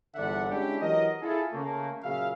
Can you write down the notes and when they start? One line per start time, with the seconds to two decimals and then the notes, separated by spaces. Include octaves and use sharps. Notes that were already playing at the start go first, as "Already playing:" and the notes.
0.15 G1 E2 D3 D5 E5 F#5
0.51 G#3 C#4 D4 E4 G4
0.81 E3 F#3 G4 A#4 D#5
1.22 E4 F4 G#4 A4
1.53 C#3 A3 A#3
2.04 A#2 C#3 F#3 E5 F5